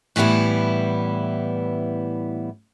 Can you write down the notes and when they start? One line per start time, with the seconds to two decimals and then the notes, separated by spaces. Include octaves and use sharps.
0.16 A2 E3 G3 B3 E4